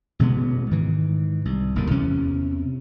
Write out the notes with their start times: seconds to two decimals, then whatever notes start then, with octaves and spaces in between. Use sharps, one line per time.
0.19 A1 B2 G#3 B3
0.71 G#2 D#3 E3
1.45 C2
1.76 F#1 D#2 A2 D#3
1.91 E2 C3 C#4